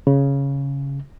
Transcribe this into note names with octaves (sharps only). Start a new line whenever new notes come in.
C#3